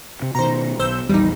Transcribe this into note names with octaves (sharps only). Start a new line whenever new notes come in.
C3
B2 D#3 C5 A#5
B1 C5 E6 G6
A#1 E2 G3 D#4